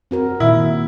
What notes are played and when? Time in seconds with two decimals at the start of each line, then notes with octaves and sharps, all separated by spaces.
0.11 C4 F#4 A#4
0.40 A#2 D#3 E4